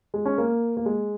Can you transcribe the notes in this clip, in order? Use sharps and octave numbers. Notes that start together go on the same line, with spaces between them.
G#3
C#4
A#3
A#3
G#3